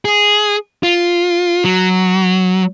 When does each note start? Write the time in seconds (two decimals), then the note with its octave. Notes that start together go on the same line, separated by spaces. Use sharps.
0.05 G#4
0.83 F4
1.64 F#3